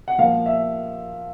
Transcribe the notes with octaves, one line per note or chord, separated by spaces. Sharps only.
F#5
A#2 F3 A#3 F5
E5